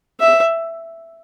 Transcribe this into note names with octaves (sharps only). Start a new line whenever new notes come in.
E5